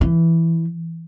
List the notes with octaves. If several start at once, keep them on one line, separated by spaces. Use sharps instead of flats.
E3